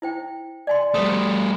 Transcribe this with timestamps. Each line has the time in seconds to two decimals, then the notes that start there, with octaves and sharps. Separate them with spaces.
0.02 E4 C5 G5
0.67 D5 G#5 C6
0.94 G3 A3 C5 C6 D#6